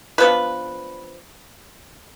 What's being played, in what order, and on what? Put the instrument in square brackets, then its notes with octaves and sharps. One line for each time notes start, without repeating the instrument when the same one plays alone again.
[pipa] F3 B3 D4 B4